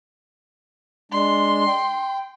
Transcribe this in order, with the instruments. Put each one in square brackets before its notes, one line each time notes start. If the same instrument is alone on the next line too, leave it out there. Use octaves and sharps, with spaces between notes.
[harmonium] G#3 D4 [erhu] C6
[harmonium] G5